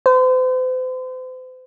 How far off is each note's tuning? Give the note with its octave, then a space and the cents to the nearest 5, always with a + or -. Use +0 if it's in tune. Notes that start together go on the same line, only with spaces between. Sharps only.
C5 -40